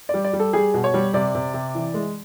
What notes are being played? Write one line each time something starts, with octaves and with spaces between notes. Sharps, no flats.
G3 D5
D5
G3
A4
G3 G#4
B2
C#5
G3
C3 D5
C3
C3
E3
G#3